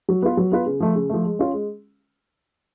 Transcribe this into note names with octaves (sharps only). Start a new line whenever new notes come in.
F#3
B3 F4 B4
F#3
B3 F4 B4
C#3
F3 A3
C#3
F3 A3
G#3
C#4 F4
G#3